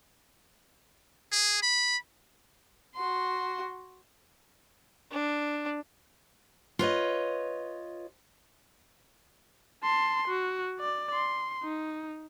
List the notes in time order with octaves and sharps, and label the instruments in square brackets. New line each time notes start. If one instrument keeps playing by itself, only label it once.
[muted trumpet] G#4
B5
[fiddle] F#4 C6
[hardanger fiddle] D4
[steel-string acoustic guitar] F4 B4 C#5 D#5
[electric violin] A5 C6
F#4
D5
C6
D#4